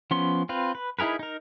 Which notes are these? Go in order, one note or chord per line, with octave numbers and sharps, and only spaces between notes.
F3 B3 C#4 C6
C4 F4 B4
B4
D#4 E4 G#4 A#4 B4
D#4 A#4